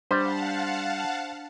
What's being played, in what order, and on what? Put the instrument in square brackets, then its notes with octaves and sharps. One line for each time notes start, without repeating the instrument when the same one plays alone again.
[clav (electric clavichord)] G3 [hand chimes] D4 B6 [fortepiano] C5 [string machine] F5 F#5 A5